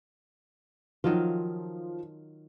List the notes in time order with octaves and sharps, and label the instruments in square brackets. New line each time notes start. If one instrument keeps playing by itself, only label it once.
[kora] D#3 F#3 F4 [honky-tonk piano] F3